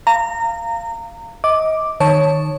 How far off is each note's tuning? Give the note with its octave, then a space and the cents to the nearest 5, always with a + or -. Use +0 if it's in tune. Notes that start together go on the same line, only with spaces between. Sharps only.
F5 -15 A#5 -25
D#5 +25 D6 +0
D#3 -20 C#5 +0 A5 +0